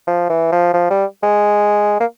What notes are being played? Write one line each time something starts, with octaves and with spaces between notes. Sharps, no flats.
F3
E3
F3
F3
G3
G#3
A#3